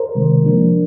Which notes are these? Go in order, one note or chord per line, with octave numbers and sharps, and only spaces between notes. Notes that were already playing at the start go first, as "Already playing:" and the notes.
Already playing: A#4 C5
C3 D#3 G#3
F3 A#3 D4